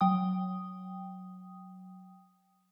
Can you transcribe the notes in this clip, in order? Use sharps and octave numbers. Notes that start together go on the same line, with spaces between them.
F#3 G5 D#6